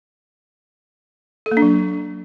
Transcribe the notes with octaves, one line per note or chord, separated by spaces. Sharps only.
A4
A#3
D4
F#3